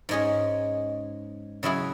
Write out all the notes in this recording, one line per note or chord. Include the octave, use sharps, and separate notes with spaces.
G#2 G#3 C#4 G#4
C#3 F#3 E4 G#4